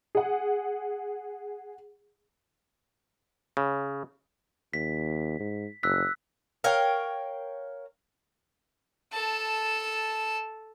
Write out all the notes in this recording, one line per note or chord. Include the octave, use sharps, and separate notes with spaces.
G#4 F#5
C#3
D#2 B6
G#2
F#1 E6 F#6 B6
A#4 C#5 F5 G5
A4 A5